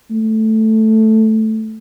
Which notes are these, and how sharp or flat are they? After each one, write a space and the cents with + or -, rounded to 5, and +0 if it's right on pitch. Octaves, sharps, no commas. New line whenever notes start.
A3 +0